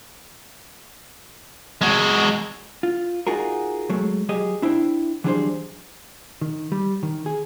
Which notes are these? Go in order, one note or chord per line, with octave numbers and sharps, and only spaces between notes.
G#3 F#4
F4
D#4 F4 F#4 G#4 A#4
F#3 G#3 A3
F#3 G4 G#4 D#5
D4 E4 C5 E5 G5
E3 F#3 G3 D4 G#4 C5
D#3
G3
D#3
G#4